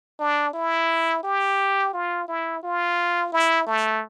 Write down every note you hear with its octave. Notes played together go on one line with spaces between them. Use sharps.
D4
E4
G4
F4
E4
F4
E4
A3